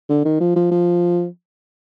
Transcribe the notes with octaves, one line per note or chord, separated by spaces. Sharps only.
D3
D#3
F3
F3
F3